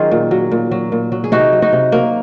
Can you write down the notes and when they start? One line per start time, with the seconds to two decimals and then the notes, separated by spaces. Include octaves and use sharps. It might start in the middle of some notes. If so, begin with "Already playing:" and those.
Already playing: D#3 F#3 C#4 F4 G#4
0.12 A#2
0.31 F#3
0.51 A#2
0.71 F#3
0.92 A#2
1.12 F#3
1.24 G#4
1.32 C3 D#4 F#4
1.53 F#3
1.62 D#4 F#4
1.73 C3
1.92 F#3 A#3